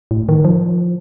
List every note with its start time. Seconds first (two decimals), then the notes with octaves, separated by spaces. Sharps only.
0.11 A2
0.29 D#3
0.44 F3